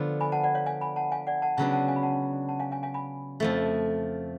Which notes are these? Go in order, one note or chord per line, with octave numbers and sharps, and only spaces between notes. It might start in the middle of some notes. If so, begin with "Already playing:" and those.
Already playing: D3 F3 B3 F4
G#5 B5
F#5 A5
D5 F#5
C#5 F5
F5 G#5
G#5 B5
F#5 A5
F5 G#5
D5 F#5
F#5 A5
C#3 F#3 B3 D4 F#5 A5
F#5 A5
F5 G#5
B5
F#5 A5
F#5 A5
F5 G#5
F5 G#5
F5 G#5
G#5 B5
F2 F3 A3